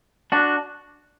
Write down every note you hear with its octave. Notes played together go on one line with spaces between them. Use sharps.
D4 F#4